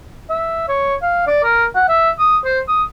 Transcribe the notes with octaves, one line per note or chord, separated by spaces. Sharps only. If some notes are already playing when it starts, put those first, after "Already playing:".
E5
C#5
F5
D5
A#4
F#5
E5
D#6
C5
D#6